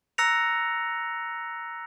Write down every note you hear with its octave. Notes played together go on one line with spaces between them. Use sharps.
A#5 E6 F#6 A#6 C#7 F7